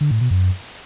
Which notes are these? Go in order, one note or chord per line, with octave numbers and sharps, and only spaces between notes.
D3
A2
B2
F#2